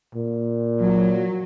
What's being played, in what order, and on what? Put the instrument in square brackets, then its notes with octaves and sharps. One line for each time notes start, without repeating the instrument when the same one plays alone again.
[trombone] A#2
[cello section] F#3